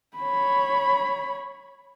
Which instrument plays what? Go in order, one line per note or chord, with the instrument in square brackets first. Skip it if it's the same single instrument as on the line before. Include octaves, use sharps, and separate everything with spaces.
[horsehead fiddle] C#5 B5